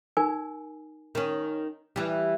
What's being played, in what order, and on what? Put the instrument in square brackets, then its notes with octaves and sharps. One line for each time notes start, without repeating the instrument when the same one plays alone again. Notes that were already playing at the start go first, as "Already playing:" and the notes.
[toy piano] D#4 A#4 G#5
[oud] D#3 C#4
E3 G3